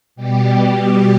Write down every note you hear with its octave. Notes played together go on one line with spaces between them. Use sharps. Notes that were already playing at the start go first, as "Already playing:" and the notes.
B2 G3 G4